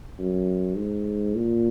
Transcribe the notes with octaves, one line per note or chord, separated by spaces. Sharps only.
F#2
G#2
A#2